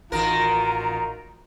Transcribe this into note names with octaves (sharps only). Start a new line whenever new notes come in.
A1 D#3 F4 F#4 A#4 A#5